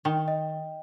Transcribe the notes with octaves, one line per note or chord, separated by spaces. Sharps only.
D#3 G5
D#5